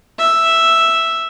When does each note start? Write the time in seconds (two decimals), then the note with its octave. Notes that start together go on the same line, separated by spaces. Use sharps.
0.19 E5